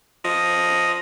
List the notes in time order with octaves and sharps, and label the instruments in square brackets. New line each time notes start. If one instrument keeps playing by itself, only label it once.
[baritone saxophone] F3 [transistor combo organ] D#5